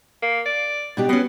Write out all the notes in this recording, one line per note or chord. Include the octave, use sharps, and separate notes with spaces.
A#3
D5
B2 D4 G4
B2 B3 C#4